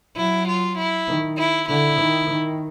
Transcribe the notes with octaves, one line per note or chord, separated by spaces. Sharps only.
F#3 E4
F4
E4
D#3
E4
D3 E4
D#3
D#3